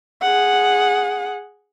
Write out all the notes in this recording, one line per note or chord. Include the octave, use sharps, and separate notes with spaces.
G#4 F#5